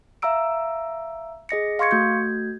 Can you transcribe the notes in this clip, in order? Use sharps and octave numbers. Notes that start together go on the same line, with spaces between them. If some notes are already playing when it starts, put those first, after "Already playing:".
E5 F5 A#5 E6 D7
G#4 D#5 A#6 C#7
F5 C6 C#6 G#6 C#7
A3 F#4 G6 G#6